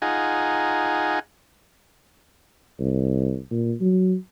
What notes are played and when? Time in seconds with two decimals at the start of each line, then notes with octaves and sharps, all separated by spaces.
0.02 D#4 F4 G#4 F#5 G#5 A#5
2.79 C2
3.51 A#2
3.80 F#3